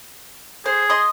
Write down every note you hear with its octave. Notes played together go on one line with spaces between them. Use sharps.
G#4 C5
D#5 C6 D#6